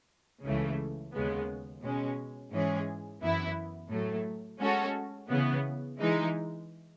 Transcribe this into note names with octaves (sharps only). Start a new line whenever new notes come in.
C#2 C#3 E3 A3
D#2 C#3 G#3 B3
B2 G#3 C#4
G#2 E3 G#3 C#4 G#4
F#2 E3 B3 E4
A2 F#3 A3
G#3 C#4 F#4 A4
C#3 E3 B3
E3 G#3 D#4